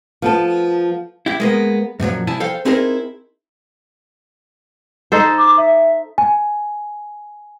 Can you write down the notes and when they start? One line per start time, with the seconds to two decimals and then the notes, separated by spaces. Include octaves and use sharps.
0.22 F3 B3 A4
1.26 E4 G4
1.40 G#3 A#3 B3
2.00 F#2 A#2 F3 F#3
2.27 C2 F3 E4 G#5 A5
2.40 A4 C5 F5 G5
2.65 C4 D#4 E4 G#4 A#4 C5
5.12 D#4 A4 C5
5.38 D6
5.57 E5
6.18 G#5